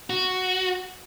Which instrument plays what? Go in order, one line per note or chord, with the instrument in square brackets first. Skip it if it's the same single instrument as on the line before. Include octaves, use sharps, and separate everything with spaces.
[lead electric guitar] F#4